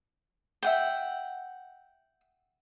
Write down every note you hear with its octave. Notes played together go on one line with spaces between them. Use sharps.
E5 F#5 G5